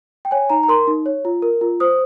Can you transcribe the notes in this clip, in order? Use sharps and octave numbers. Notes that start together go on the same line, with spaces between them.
G5
C#5 G#5
D#4 A#5
A#5
A#4 C6
D#4
C#5
F4
A#4
F4
C5 D#6